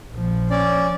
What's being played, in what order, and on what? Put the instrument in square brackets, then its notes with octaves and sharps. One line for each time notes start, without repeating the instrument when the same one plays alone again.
[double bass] A#1 F3
[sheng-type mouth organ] C#4 D5